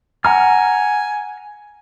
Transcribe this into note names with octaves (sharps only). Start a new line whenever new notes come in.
F#5 G#5 A#5 F6